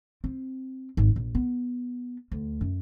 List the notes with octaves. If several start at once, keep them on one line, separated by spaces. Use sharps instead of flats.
C4
G#1
A#1
B3
D2
F#2